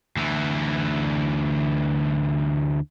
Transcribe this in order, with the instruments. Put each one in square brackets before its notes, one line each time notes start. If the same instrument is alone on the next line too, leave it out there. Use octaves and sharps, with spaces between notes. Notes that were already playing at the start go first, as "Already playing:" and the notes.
[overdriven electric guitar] D2 E3